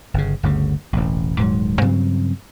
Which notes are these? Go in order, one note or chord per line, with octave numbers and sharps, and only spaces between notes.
G1 C#3
G1 D2 C#3
E1 A1
D#1 G#2 F#3
G2 C#3 F#3 C4